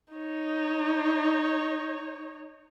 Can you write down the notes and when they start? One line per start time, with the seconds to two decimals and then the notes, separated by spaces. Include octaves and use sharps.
0.14 D#4 C#5